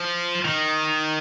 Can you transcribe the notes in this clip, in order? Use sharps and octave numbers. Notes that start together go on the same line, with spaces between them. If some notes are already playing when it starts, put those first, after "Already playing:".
Already playing: F3
D#3